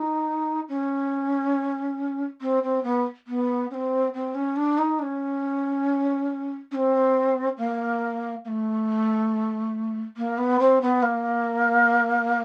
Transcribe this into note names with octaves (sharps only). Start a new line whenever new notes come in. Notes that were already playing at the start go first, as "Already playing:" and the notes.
Already playing: D#4
C#4
C4
C4
B3
B3
C#4
C4
C4
C#4
D4
D#4
D4
C#4
C#4
C4
A#3
A#3
A3
A#3
B3
C4
B3
A#3